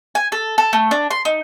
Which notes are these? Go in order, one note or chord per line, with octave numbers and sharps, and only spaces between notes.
G#5
A4
A4
A3
D4
C6
D#4